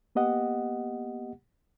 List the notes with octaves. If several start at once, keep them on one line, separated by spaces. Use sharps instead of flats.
A#3 B3 G4 D#5 F#5